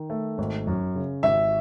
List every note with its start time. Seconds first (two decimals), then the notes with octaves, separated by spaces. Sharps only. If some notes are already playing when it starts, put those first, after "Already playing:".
Already playing: D#3
0.10 A3
0.38 G#1
0.67 F#2
0.95 C#3
1.23 G#1 E5